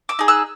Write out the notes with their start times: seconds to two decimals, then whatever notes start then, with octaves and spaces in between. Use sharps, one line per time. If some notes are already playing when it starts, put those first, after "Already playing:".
0.09 D6 E6
0.19 D#4 G#4
0.28 E6 F#6